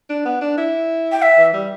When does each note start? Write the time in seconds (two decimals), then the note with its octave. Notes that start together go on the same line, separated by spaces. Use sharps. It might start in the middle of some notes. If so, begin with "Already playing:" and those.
0.09 D4
0.25 B3
0.41 D4
0.57 E4
1.12 G5
1.22 E5
1.38 E3
1.54 G3